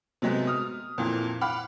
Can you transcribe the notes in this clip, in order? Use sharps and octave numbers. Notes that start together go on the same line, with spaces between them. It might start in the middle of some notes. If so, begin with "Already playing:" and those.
C3 F#3 G#3 A3 B3
D#6 F6
F2 A#2 E3
F5 F#5 B5 D6 F6